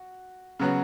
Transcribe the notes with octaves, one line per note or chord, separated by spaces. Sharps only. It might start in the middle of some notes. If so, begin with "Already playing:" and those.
Already playing: F#4
C#3 F#3 B3 F#4